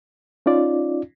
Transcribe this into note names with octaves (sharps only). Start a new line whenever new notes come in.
C#4 D#4 F4 D5